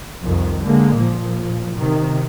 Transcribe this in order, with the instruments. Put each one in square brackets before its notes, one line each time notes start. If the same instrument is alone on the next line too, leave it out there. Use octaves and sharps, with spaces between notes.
[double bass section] C2 F2 D#3
D3 G#3 A#3
A#2 F3
C3 D#3